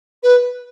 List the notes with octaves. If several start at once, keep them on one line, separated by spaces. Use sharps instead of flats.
B4